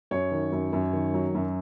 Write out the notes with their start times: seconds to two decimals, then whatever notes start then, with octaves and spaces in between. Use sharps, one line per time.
0.11 F#2 C#5
0.32 D#3
0.52 F#2
0.73 F#2
0.93 D#3
1.14 F#3
1.35 F#2